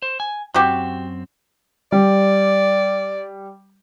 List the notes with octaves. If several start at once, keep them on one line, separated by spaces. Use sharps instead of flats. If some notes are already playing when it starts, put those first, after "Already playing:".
C5
G#5
F#2 C4 F#4 G4
G3 D5